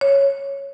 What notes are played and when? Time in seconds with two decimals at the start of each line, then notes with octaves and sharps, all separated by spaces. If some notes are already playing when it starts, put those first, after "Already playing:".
0.01 C#5